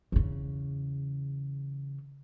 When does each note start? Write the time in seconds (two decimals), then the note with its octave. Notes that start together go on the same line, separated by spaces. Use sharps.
0.12 E2 C#3